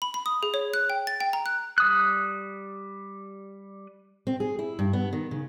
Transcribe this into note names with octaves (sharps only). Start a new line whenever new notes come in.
B5
B5
D#6
G#4
C#5
F#6
G5
A6
G5
A#5
F#6
G3 D#6 F#6
C4
G#4
E4
G2
B3
D#3
C#3